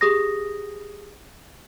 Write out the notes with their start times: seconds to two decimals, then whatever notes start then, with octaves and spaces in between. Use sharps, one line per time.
0.01 G4 G#4 D#6 A#6